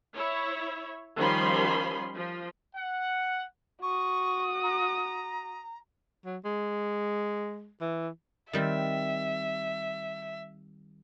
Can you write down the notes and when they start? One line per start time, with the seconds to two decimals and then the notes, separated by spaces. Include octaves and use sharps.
0.15 E4 C#5
1.16 D#3 F3 G3 C#4 B5 C6
2.15 F3
2.75 F#5
3.82 F#4 C#6 D#6
4.63 A#5
6.26 F#3
6.45 G#3
7.81 E3
8.53 D#3 G3 C4 E5